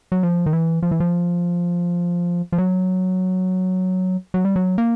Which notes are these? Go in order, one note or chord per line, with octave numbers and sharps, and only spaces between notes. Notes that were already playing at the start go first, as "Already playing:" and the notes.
F#3
F3
D#3
E3
F3
E3
F3
F3
F#3
F#3
G3
F#3
A#3